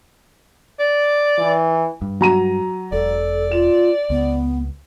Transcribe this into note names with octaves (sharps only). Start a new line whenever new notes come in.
D5
E3
G2
F#3 A#5 D#7
E1 A4 D5
F4 E7
C#2 B3